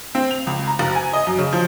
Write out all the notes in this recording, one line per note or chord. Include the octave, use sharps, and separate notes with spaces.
C4
F7
C#2
A#5
F#1
G#5
D#5
F#2
C#3
F3